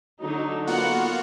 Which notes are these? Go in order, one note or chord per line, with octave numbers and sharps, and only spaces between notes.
D3 F#3 D#4
A#3 B3 F4 F#4 F#5